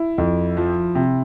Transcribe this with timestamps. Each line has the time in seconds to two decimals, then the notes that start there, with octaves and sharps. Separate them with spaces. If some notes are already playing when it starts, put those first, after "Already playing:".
Already playing: E4
0.18 F2
0.57 F3
0.95 C3